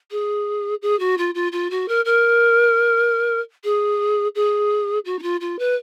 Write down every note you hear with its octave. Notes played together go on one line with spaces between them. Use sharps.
G#4
G#4
F#4
F4
F4
F4
F#4
A#4
A#4
G#4
G#4
F#4
D#4
F4
F4
B4